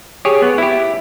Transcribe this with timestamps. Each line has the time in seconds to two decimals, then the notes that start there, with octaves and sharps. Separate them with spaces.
0.25 G4 G#4 C#5
0.42 B3
0.58 E4 G4